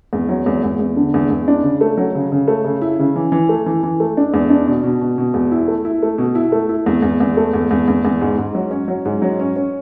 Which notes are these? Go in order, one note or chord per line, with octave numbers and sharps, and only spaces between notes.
E2
F#3
E2
E2
E2
D3
E2
E2
D4
C#3
A3
F#3
C#3
C#3
A3
C#3
E4
C#3
E3
E3
A3
E3
E3
A3
D4
E2
D4
B2
B2
B2
B2
E2
E4
A3
E4
A3
B2
E4
A3
E4
E2
E2
E2
A3
E2
E2
E2
E2
G#2
G#2
F#3
C#4
F#3
G#2
F#3
C#4
C#4